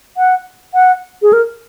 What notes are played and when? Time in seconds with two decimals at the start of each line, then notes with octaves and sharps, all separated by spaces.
0.17 F#5
0.74 F#5
1.22 G#4
1.33 A#4